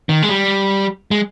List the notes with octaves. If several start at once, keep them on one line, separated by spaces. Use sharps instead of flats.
D#3
G#3
G3
G#3